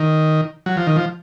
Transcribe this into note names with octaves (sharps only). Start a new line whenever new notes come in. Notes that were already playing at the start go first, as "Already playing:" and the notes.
Already playing: D#3
F#3
F3
D#3
F3